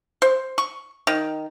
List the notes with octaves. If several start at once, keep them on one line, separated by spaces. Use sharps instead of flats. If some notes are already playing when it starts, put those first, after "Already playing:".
C5
C#6
D#3